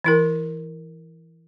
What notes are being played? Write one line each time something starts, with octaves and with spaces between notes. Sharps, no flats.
E3 E4 A#4